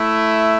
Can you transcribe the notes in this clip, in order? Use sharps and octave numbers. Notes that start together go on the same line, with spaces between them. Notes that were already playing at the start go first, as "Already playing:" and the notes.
Already playing: A3 E4